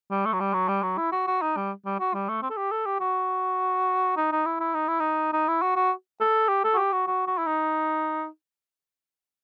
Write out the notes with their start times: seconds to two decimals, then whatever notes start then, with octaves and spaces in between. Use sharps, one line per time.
0.11 G3
0.26 A3
0.33 F#3
0.40 G3
0.53 F#3
0.68 G3
0.82 F#3
0.97 E4
1.12 F#4
1.27 F#4
1.42 D#4
1.56 G3
1.85 G3
2.00 F#4
2.14 G3
2.29 A3
2.43 C4
2.50 A4
2.57 G4
2.71 A4
2.86 G4
3.00 F#4
4.17 D#4
4.32 D#4
4.46 E4
4.60 E4
4.74 D#4
4.88 E4
5.00 D#4
5.33 D#4
5.48 E4
5.62 F#4
5.76 F#4
6.20 A4
6.48 G4
6.64 A4
6.74 F#4
6.77 G4
6.92 F#4
7.07 F#4
7.27 F#4
7.38 E4
7.46 D#4